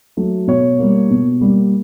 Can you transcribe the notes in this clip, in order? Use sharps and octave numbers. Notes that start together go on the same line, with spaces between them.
F#3 A3
B2 C#5
G3 A#3
B2
G3 A#3